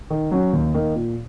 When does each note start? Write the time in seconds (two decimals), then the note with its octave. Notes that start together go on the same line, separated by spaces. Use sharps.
0.10 D#3
0.31 F#3 C#4 F#4
0.53 D#2
0.74 D#3 A#3 D#4
0.95 A#2